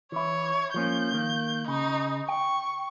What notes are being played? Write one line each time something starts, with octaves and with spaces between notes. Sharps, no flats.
E3 E4 C#5
F3 A#3 C#4 G6
D#3 A#3
C#3 D#4
G5 C#6